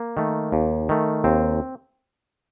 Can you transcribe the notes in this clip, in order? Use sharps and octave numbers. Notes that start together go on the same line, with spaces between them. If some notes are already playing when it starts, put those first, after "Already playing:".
Already playing: A#3
D#3 A3
D#2
D#3 A3
D#2 C4